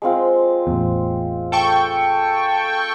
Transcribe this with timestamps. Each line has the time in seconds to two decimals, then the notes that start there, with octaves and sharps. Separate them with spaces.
0.02 G#3 C4 F4
0.67 A1 E2
1.52 A4 G5 C#6